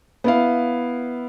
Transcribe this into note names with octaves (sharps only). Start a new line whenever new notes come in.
B3 E4 F5